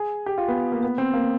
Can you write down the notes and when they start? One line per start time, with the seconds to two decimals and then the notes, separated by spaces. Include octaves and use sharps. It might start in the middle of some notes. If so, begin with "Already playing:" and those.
Already playing: G#4
0.26 G4
0.38 F4
0.48 B3
0.72 A#3
0.83 B3
0.98 C4
1.14 A#3